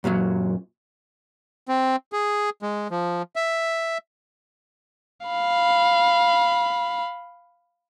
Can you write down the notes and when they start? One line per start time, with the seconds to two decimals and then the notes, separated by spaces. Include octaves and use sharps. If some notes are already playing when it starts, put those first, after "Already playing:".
0.04 F#2 A#2 D3 F#3
1.69 C4
2.13 G#4
2.62 G#3
2.91 F3
3.36 E5
5.27 F5 B5